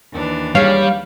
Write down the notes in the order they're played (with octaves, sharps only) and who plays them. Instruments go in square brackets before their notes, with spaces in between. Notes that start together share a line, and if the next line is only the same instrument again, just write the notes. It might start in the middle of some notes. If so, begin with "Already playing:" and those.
[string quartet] D#2 E3 D4
[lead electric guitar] G3 [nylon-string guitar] G#4 C#5 [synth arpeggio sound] F5